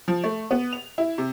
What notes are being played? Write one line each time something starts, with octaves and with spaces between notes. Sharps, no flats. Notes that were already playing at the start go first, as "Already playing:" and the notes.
F3
A3
B3
F7
E4
C3